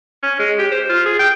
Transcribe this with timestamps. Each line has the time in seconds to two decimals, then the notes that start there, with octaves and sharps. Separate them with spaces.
0.23 C#4
0.39 G#3
0.59 G4
0.71 C5
0.89 F4
1.06 G#4
1.19 G5